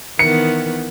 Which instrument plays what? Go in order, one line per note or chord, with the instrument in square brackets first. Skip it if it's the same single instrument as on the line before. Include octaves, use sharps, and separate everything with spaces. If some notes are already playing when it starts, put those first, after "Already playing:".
[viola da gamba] D#3 E3 B3 [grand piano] C#7